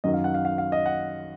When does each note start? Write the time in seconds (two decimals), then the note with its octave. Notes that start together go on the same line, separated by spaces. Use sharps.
0.04 F#2 D#3 F#3 D#5
0.14 F5
0.24 F#5
0.34 F5
0.45 F5
0.58 F5
0.72 D#5
0.86 F#5